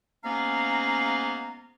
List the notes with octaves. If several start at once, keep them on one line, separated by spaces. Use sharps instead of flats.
G#2 A#3 B3 C#4 F5 A#5